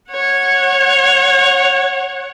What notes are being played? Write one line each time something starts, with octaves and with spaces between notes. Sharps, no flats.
C#5 F#5